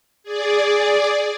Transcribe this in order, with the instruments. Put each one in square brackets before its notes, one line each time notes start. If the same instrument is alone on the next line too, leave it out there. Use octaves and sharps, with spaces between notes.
[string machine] G#4 D5